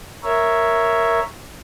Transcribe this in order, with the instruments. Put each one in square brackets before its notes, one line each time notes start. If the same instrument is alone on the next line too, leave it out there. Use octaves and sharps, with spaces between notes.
[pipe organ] A#4 C#5 E5